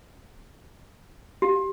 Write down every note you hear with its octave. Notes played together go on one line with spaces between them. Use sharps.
G4